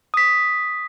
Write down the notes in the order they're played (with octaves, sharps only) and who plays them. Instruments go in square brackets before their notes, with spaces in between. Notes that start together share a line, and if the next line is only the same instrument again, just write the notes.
[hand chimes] D#6 B6